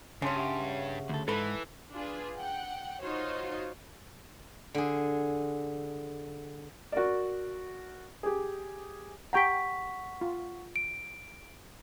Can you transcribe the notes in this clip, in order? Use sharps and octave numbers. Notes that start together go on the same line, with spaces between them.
G2 C#3 C#4 G#5 A5 C6
G4 E5 F#5
D2 A4
G#2 E3 A4 B4
D4 F4 G#4 B4
F#5 G5
D#4 F4 F#4 C5 C#5
D3 G#4
F#4 A#4 D5
G4 G#4
G4 F#5 G5 A#5 C#6 B6
F4
D7